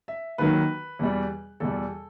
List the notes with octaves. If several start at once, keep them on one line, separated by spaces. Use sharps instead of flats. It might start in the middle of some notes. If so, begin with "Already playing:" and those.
E5
D#2 D#3 F#3 B4
E2 B2 G3
E2 B2 G3 A4